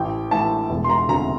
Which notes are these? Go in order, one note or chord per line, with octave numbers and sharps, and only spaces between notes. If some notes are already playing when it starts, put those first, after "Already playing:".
Already playing: A1 G5
A2 E3 A5
E1
C6
A#5
D2 C3 A#5